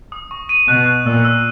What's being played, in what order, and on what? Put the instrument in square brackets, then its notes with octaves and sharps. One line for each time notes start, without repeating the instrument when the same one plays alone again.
[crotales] D#6
C#6
D#7
[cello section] B2 [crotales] F#6
[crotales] F#6
[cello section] A#2 [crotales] E6
[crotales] E6